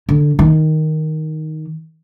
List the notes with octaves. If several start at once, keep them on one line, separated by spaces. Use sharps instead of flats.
D3
D#3